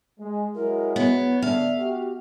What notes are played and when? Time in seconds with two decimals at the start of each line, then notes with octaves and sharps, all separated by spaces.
0.19 G#3
0.55 F#3 G#3 E4 A#4
0.96 B3 C#5
1.42 D3 E5 F5
1.78 F#4 G4